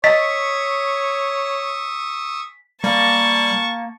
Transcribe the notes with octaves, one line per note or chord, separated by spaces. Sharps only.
C#5 D#5 C#6 D#6 E6 B6
G3 A#3 A5 C#6